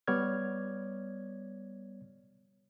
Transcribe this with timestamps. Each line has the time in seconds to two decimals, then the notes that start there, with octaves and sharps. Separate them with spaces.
0.07 G3 B3 C#5 D5 F6 G#6